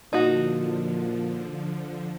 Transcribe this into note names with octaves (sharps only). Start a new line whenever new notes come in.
A#2 D3 F3 D#4 F#4